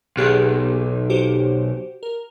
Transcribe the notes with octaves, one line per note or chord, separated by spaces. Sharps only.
B1 B3 G4 G#4
F#4 G4 C5
A#4